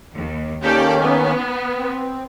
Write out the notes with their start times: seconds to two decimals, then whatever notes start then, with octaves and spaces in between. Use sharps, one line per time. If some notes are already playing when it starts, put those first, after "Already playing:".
0.14 D#2
0.63 D#3 A#3 C#4 G4 A4 D5
0.99 B3
1.77 C4